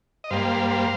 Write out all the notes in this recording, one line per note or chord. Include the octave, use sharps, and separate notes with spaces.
D#5
G2 G3 A#3 C5 F5
C5 F5